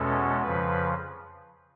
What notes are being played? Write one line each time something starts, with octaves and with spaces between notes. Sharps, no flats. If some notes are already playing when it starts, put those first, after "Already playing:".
Already playing: E2 B2 G#3 C#4 A4
F2 C#3 F3 B4